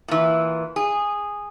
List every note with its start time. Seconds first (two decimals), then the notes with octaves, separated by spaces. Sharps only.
0.08 A#2 E3
0.76 G#4